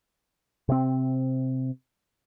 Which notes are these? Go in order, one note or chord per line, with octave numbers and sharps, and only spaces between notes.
C3 C4